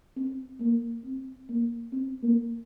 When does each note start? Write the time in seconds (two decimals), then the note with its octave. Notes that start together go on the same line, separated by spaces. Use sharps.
0.16 C4
0.60 A#3
1.05 C4
1.49 A#3
1.93 C4
2.23 A#3